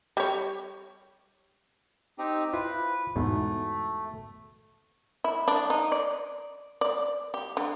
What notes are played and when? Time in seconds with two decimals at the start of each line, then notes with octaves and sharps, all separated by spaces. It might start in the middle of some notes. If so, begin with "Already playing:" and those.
0.17 G3 C#5
2.18 C4 D#4 G4
2.53 E4 F4 B4 C5
3.16 E2 G#2 B2 A3
5.24 E4
5.48 D4
5.70 D#4
5.92 D5
6.81 D5
7.34 G4
7.57 D3